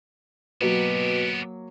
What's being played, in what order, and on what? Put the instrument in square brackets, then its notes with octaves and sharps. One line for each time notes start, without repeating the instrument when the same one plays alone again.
[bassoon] B2 [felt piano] F#3 A#3 [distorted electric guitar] B3 G4